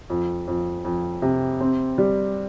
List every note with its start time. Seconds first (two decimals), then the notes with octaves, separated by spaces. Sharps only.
0.10 F2
0.47 F2
0.85 F2
1.22 C3
1.61 C4
1.98 G3